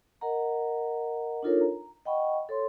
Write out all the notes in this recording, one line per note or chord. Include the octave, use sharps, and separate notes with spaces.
A#4 D#5 F#5 A#5
D4 D#4 F4 A4 A#4 C#5
A#5
D#5 F#5 G5 B5 C#6
A4 C#5 C6